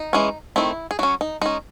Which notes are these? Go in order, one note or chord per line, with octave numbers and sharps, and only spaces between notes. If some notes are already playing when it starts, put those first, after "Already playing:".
Already playing: D#4
E3 G#3 C#4
D#3 A3 C4 E4
G#4
F#3 C#4 F#4
D#4
G#3 C#4 D#4